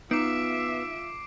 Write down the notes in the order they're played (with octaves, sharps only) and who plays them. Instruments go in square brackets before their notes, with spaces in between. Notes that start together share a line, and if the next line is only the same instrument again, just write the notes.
[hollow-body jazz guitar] B3 [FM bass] D#4 [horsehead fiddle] F4 E5 [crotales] D6 C7 D7